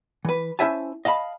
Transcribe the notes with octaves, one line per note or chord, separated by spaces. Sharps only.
E3 B4
C#4 E4 C5 E5 G#5 A5
D#5 F5 A5 B5